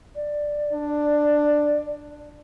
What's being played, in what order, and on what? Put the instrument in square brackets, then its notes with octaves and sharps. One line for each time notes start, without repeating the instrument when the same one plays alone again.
[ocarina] D5
[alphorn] D4